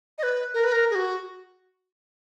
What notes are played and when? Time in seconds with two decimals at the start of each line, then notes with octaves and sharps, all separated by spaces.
0.18 D#5
0.23 B4
0.54 A#4
0.64 B4
0.72 A#4
0.90 G#4
0.95 F#4